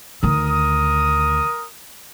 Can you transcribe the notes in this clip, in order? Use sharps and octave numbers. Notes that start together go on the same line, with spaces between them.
D2 D#3 A#4 D#6